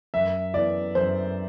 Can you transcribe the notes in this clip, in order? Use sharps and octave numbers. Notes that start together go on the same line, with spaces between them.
F#2 E5
E3 B3 D5
F#2 C5